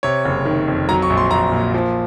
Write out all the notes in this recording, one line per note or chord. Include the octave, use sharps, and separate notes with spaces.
C3 C#5
F#1
D#3
F2
F#3 A#5
C#6
A#1
C6
A#1 A#5
A#2
F3